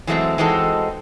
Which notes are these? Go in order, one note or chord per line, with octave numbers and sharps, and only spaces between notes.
E3 F#3 G#3 A3 B3 C4
E3 G#3 C4 D#4 F#4 A4